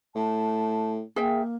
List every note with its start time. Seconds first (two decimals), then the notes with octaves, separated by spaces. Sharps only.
0.15 A2 A5
1.16 A#3 G#4 E5 G5